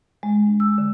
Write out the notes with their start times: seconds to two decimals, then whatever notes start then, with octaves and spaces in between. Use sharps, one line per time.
0.23 G#3
0.47 D4
0.60 E6
0.78 D3